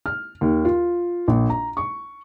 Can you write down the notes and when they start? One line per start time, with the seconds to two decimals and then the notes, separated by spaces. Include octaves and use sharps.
0.06 F6
0.41 D#2
0.65 F4
1.28 A#1
1.50 A#5
1.77 C#6